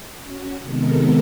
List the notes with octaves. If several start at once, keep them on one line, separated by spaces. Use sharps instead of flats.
C#4 F#4
C3 D#3 G#3 B3 A4 A#4